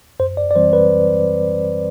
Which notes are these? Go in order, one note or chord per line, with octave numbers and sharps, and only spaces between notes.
F#2 C5
D5
D5
E3 G3 C4 C5
B4